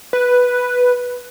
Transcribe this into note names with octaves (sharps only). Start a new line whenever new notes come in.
B4